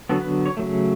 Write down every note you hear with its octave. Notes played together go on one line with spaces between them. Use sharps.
D3 F#3 B3 A4
B4
C#5
C#3 F#3 A3